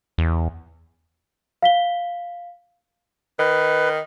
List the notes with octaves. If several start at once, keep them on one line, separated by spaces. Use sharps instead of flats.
E2
F5 B6 G7
D#3 B4